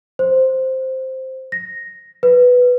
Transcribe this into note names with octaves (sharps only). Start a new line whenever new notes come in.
C5
A#6
B4